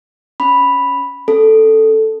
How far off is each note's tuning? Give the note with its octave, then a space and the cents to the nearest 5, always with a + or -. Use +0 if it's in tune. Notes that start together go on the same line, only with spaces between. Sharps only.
C#4 +0 B5 +0
C#4 -10 A4 +0